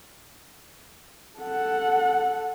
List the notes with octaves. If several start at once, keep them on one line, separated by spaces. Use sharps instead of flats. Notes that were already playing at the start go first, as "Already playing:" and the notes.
A4 F#5